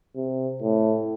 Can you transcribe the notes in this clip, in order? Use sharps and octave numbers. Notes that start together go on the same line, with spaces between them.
C3
A2